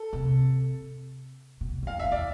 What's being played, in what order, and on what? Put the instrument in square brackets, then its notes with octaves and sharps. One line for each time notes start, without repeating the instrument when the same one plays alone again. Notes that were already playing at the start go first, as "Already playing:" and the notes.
Already playing: [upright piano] A4
[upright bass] C3
B2
F2
[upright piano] F5
[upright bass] E2 [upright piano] E5
[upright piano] D5